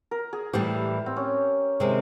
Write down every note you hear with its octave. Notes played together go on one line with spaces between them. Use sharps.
A#4
G#4
A2 E3 G3 G4
C4
C#4
C3 D#3 G#3 C4